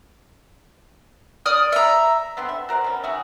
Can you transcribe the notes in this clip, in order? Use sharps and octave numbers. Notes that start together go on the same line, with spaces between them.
D5 D#6 F6
E5 A#5
D3 B3 C4 C6
E5
F#4 A#4 C5 D5
B2 C#4
D#3 F#4 G#4 E5